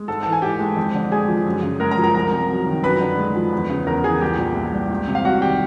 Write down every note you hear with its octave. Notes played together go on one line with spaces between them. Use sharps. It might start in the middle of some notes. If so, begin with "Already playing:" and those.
Already playing: G#3
G#2 A4 A5
E3 A5
G#5
G#2 G4 G5
G#3
F2
D3
G#3 G#4 G#5
F3
F#2
C#3
G#3 A#4 A#5
A#4 A#5
F3
A#4 A#5
C2 A#4 A#5
C3
F#3
D#3
F#2 B4 B5
D3
G#3
F3
E2
C#3
E2 A#4 A#5
E3 G#4 G#5
C2 G4 G5
A#2
C2
G3
C#2
C3
F5
G3 F#4 F#5
D#3 G4 G5